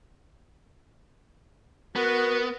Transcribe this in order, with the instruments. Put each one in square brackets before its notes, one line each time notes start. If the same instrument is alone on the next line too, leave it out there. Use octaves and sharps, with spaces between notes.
[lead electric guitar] B3 [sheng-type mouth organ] F#4 [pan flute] A#4